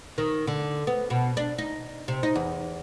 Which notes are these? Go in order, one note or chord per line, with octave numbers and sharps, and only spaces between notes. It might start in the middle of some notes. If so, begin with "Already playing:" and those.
D#3
D3
B3
B2
D4
D#4
C3
D#4
E2